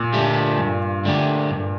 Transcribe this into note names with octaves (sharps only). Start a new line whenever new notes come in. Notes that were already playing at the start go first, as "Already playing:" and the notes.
Already playing: A#2
D3 A3 D4 G4
G2
D3 A3 D4 G4
G2